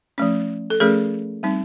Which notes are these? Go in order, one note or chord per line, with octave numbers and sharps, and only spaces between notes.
F3 A3 C#4
A4
F3 A3 C#4 G#4 A#4
G3 C4 D#4